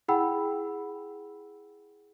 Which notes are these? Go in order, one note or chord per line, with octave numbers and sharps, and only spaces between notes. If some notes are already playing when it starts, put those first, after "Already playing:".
E4 G#4 F#5 G5 B5 E6